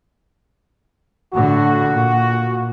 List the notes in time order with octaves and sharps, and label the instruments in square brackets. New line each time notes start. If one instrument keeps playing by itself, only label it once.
[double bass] A2 D3 [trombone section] F#4
[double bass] A#2